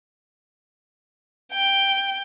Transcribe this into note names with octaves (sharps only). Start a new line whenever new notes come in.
G5